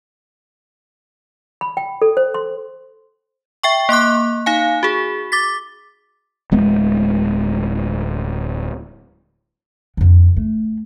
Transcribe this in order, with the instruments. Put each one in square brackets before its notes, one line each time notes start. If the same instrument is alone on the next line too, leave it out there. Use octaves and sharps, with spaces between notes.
[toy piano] B5
G5
A4
C5
C6
[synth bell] E5 G5 C#6
A#3 C6 D6 F#6
D#4 F5 G#5
F#4 G#4
D6 A6 B6
[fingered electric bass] D1 G#3 B3
[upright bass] F2 D3
A3